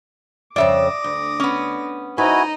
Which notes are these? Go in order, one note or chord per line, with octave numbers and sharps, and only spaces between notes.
F2 C#3 C#5 D5 E5 D6 D#6 A#6
D2
B3 C#4
D#4 E4 F#4 B4 D#5 G#5